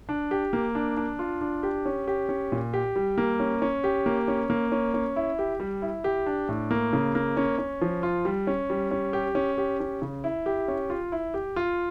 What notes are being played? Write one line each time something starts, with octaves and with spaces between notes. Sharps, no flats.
D4
G4
A#3
D4
D4
F4
D4
G4
C#4
G4
C#4
A#2
G4
G3
A#3
C#4
C#4
G4
A#3
C#4
A#3
C#4
C#4
E4
G4
G3
E4
G4
D4
A2
A#3
C#3
A#3
C#4
C#4
F3
F4
G3
C#4
G3
C#4
G4
C#4
G4
C#4
C#3
E4
G4
C#4
F4
E4
G4
F4